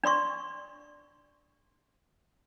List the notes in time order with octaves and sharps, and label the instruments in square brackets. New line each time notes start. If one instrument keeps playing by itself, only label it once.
[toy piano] D4 D5 C6 C#6